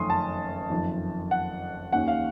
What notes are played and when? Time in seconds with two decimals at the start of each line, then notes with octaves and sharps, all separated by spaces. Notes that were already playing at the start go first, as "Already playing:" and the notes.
Already playing: F#1 F2 D#3 A3 C#4 C6 D#6
0.10 A5
0.70 F#1 F2 D#3
1.31 F#5
1.92 D#2 D#3 A#3 C#4 F#5
2.08 F5